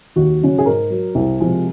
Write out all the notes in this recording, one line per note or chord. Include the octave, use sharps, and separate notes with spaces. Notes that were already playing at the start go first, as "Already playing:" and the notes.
D#2 F#4
C#3 F#3
G#4
G#2 A#4
F#3
C2
C3 F3 G#3